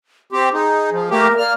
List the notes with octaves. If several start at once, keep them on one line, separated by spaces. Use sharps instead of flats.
C4 G4 C6
D#4 G#4
F3
A3 A#3 G4 A#4
A#3 D5 F6